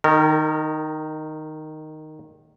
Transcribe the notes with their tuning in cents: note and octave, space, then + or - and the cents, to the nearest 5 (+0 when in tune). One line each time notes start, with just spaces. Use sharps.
D#3 -5 A#4 -35